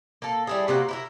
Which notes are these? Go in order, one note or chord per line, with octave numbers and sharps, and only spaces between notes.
A#3 A4
G3 E4 G#4
C3 A#3 F#4
E4 G4 A#4